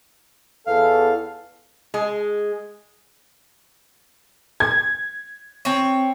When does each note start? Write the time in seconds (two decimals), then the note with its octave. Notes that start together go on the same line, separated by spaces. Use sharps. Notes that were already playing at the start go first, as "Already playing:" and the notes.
0.67 E2 A4 F5
1.94 G#3
4.60 G#6
5.65 C4 C#5